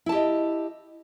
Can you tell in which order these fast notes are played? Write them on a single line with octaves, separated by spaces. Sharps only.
E4 A5 G4 D#5